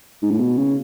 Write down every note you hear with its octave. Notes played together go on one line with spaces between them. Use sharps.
G#2
A2
B2
C#3